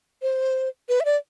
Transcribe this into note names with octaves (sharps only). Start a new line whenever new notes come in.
C5
B4
E5
D5